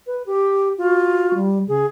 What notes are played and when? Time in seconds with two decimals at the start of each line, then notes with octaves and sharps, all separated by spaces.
0.07 B4
0.26 G4
0.78 F4 F#4
1.35 G3
1.68 C#3 G#4